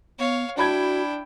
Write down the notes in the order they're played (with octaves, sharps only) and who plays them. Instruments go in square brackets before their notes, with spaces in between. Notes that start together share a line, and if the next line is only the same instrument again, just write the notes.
[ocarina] B3 [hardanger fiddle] C#5 F5
[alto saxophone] D4 [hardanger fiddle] E4 G5 [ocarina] F#4 [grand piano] A5 B5 G#6